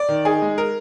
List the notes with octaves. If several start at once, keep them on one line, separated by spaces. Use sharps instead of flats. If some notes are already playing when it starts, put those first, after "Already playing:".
Already playing: D5
D#3
D#4 G#4
G#3
A#4